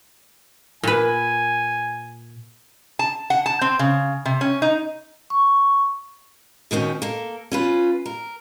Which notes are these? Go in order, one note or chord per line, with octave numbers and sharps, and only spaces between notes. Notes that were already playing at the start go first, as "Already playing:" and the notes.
A#2 B4 G#5
A5
F#5
A5
C4
C#3
C3
C#4
D#4
C#6
B2 D#3 C4 C#4
A#3 A4
C#4 F4 B4
A#4